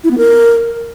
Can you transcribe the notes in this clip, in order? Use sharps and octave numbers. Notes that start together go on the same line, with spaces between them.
E4
B3
A#4